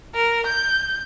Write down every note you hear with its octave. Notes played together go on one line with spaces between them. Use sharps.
A#4
G6